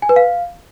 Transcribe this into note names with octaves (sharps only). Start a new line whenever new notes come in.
G#5
B4
F5